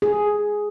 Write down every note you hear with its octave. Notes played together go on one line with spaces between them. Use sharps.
G#4